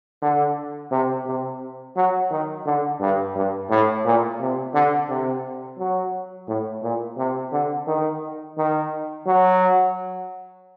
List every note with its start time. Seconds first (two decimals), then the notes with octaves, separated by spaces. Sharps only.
0.22 D3
0.92 C3
1.27 C3
1.96 F#3
2.31 D#3
2.66 D3
3.01 G2
3.35 G2
3.70 A2
4.05 A#2
4.40 C3
4.75 D3
5.09 C3
5.79 F#3
6.48 A2
6.83 A#2
7.18 C3
7.53 D3
7.87 D#3
8.58 D#3
9.27 F#3